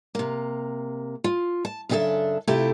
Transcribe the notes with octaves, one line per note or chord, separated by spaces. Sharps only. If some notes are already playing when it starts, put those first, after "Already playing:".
C3 A#3
F4
A5
F#2 C#3 D4 G4 A4 E5
C3 A3 E4 F4 G4 A4